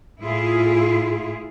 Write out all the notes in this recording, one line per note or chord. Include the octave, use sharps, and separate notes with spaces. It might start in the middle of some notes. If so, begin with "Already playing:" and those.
A2 E4 F4 G#4